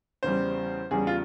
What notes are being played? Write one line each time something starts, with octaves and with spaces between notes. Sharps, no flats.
E2 C#3 G3 C5
E2 C#3 G3 G#4
F4